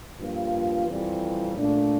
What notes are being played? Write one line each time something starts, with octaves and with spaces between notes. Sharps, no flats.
G2 F3 A#3 F4
F2 C3 E3 G3 C4
A#2 A3 D4